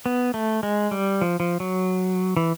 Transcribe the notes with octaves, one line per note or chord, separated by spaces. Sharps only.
B3
A3
G#3
G3
F3
F3
F#3
E3